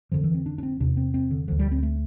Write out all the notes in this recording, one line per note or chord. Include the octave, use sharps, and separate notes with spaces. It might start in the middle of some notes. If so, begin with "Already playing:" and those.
F2 D3 F3
E3
C4
D4
D4
C4
E2 C3 D4
C4
C4
D3
D2 D3 F3
G3
C4
A3